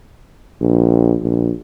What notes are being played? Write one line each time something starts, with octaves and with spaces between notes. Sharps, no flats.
A#1
A#1